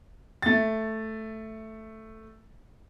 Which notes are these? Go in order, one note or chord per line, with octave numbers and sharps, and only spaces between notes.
A3 A6